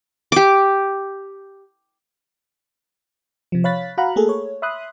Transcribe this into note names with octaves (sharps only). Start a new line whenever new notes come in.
G4 D6
C3 F3
C#5 F5 B5 F#6 A6 B6
F#4 F5 F#5 A#5 B5 F#6
A3 A#3 G#4 A4
C#5
E5 B5 C6 D#6 F#6